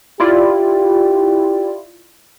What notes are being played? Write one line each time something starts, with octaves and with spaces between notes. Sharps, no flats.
E4 F4 G4 D5